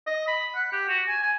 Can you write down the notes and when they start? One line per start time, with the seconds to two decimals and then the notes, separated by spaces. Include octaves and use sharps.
0.07 D#5
0.28 B5
0.55 F#5
0.72 G4
0.89 F#4
1.08 G#5
1.22 G#5